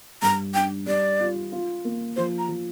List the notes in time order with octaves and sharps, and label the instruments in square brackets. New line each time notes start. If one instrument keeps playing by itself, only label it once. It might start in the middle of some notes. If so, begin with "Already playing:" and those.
[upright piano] G2 [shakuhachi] A#5
[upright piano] D4 [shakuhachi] G5
[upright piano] G3 [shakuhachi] D5
[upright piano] F4
F4
A#3
[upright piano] F3 [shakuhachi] C5
[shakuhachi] A#5
[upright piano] F3